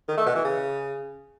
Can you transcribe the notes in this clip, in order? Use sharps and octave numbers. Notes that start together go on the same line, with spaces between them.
D#3
A3
B2
E3
C#3